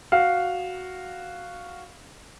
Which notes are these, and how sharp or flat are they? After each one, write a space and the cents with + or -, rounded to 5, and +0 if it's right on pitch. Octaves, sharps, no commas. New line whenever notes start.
F#4 +0 F5 +0